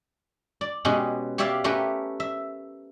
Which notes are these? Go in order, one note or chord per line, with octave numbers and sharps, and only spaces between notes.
D5
B2 G#3 C#4 G4
G4 C#5 D5 E5 F5 G5
A3 C#4 G4 A#4 B4
E5